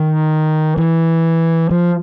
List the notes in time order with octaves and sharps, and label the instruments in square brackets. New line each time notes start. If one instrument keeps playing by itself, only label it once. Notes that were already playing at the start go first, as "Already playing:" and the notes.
Already playing: [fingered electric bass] D#3
E3
F3